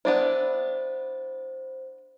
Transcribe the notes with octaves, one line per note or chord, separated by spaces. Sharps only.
B3 D4 E4 C5